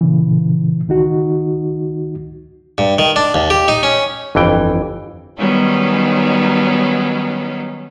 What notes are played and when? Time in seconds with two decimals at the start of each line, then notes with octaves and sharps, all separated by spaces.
0.01 A#2 C#3 E3
0.88 C#2 D#3 D#4 F#4
2.78 G2
2.99 D#3
3.16 D4
3.34 D#2
3.50 G4
3.68 D#4
3.83 C#4
4.35 G1 F2 E3 G5
5.38 D#3 F#3 G3 B3 C#4 D#4